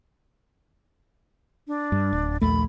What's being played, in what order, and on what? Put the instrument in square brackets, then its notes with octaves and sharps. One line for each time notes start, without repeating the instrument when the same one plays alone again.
[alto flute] D4
[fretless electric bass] G2
D1
[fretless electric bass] A#1 D#2 A3 [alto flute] B5